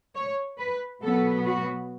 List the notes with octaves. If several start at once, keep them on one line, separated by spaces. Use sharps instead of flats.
C#5
B4
B2 F#3 B3 A4
F#4